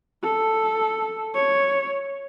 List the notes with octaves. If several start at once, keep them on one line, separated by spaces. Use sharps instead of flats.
A4
C#5